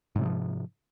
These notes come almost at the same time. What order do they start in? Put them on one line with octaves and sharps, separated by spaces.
G#2 C3 F#3 F3